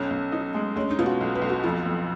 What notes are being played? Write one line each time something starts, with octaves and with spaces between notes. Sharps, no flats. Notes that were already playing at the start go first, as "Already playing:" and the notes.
Already playing: B1 C#4
B1
D#4
G#3
G#3 C#4
D#4
B2 F4
F#4
B1
B4
B1
F#4
F2 F4
F2